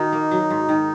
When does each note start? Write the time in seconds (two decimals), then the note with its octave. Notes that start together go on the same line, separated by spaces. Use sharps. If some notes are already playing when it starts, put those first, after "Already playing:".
Already playing: D#3 D#4 F#4
0.12 A#3
0.31 F#3
0.50 G#2
0.69 D#3